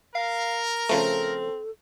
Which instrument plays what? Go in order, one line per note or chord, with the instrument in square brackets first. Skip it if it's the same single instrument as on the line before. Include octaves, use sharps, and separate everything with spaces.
[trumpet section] A#4 [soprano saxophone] F5
[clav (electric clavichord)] C#3 F3 A3 [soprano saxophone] C4 [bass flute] A4